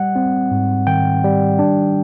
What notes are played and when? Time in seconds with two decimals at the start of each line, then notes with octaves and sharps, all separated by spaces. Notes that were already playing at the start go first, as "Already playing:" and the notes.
Already playing: G3 F#5
0.16 C4
0.51 G#2
0.87 D#3 G5
1.24 G3
1.59 D4